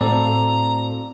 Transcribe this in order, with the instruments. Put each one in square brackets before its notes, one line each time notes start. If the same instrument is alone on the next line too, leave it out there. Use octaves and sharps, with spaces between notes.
[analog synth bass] A2 [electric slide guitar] C4 F#4 F5 [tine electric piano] A4 C5 D5 [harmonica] A#5